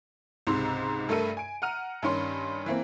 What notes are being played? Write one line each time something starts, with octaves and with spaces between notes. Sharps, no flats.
C#2 G#2 C3 A#5 C6 E6
G2 A3 A4 A#4 E5 D#7
G#5 D7
F#5 A#5 F6 D#7
G2 D#3 C#4 C6
E3 A#3 C4